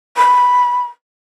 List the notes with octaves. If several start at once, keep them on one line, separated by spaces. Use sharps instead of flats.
B5